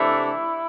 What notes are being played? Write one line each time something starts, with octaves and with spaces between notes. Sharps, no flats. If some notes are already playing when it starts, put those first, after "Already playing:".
Already playing: C3 E3 A3 D4 E4